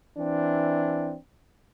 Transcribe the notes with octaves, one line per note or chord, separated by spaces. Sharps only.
E3 C4 D4